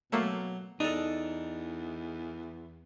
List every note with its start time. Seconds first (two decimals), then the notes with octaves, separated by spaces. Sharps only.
0.13 B2 F#3 A3 A#3
0.80 E2 D4 D#4 A4